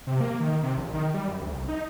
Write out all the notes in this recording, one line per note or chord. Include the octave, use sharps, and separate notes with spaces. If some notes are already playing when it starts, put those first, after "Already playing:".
C3
A#3
D#3
C3
A#1
D#3
G3
F#2
D2
C2
D#4